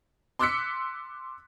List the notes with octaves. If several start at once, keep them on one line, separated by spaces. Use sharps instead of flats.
C6 D6 E6 F#6 B6 C#7